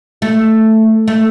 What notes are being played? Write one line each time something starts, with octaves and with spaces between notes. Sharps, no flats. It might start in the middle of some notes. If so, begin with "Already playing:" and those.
A3
A3